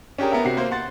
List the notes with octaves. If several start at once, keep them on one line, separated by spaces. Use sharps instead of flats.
C#4 D4 G4 G#4 A#4
B3 A#4 E5
C3 F#4 C7
A#3 C5
F#5 C6 A6